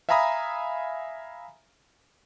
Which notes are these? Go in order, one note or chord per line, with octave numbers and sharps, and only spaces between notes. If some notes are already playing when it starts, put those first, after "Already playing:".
E5 F5 G#5 A#5 B5 D#6